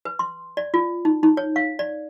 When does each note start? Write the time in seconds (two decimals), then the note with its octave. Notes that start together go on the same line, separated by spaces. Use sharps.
0.05 B4
0.19 C6
0.57 D5
0.74 F4
1.05 D#4
1.23 D#4
1.37 C#5
1.56 F5
1.79 D5